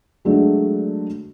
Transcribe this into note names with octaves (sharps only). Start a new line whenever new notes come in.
D3 F#3 G#3 A3 D4 F#4